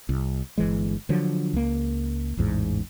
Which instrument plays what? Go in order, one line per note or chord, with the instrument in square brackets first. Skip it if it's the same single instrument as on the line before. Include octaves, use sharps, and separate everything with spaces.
[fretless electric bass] C2
G1 E3 G#3
D3 F3 F#3
C#2 A#3
A1 E2 G#2